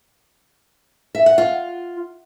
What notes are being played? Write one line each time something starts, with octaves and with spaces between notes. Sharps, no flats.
E5
F#5
F4